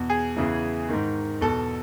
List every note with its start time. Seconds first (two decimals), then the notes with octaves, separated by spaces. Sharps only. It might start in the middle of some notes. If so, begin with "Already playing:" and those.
Already playing: E2 B2
0.10 G#4
0.36 E2 C#3 E3
0.89 G#2 D#3
1.41 E2 B2 A4